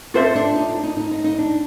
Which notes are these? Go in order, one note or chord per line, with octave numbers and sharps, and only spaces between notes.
C4 F4 A4 C5 E5
D4
D#4
D4
D#4
D#4
D#4
D#4
D4